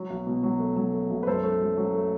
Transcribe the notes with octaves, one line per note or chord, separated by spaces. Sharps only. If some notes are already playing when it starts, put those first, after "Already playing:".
Already playing: F#3
B1
B2
F#3
A3
F#3
A3
B1
B4
F#2 A4 C5
A3
F#2
F#3
A3